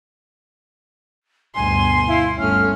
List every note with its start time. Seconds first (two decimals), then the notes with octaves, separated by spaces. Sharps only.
1.55 D2 G2 B2 G#5 C6
2.07 E4 F5
2.38 G1 A3 C#4 F6